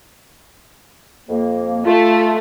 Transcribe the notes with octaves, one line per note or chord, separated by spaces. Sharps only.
F2 A#3
A3 F4